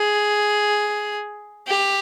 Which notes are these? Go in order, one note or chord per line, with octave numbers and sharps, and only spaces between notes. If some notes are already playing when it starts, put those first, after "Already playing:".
Already playing: G#4
G4